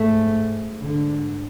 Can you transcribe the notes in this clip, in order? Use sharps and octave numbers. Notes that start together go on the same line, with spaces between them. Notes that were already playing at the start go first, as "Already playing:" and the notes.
Already playing: G#2 A3
G#2 D3